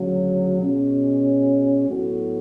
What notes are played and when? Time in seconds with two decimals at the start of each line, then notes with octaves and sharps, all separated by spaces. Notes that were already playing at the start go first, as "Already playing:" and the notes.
Already playing: D2 C#3 F#3
0.58 B2 G#3 C#4
1.87 A2 F#3 B3 F#4 A4